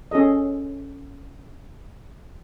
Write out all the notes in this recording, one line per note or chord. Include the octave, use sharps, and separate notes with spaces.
C#4 G#4 A4 D#5